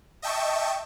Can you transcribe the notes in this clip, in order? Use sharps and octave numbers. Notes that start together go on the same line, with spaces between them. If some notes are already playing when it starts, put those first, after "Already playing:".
D#5 E5 G5 A5 C#6